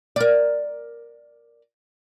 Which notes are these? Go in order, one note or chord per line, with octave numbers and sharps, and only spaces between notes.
A#4 D5